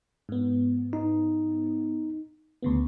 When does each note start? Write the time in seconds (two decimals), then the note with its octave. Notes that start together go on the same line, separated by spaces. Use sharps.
0.29 G#2 B3
0.93 D#4
2.63 D2 C#3 B3